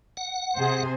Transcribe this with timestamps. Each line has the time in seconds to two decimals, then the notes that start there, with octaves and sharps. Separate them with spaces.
0.17 F#5
0.57 C3 G#4 C5